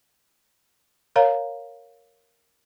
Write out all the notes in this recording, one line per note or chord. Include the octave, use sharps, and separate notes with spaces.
A#4 C#5 F5 A#5